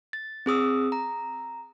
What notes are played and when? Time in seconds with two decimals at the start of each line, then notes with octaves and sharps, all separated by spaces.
0.13 A6
0.46 C4 G#4 D#6 E6
0.92 A#5